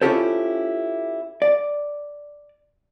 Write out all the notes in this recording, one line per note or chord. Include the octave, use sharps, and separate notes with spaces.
C#4 E4 F4 G4 A4 C5
D5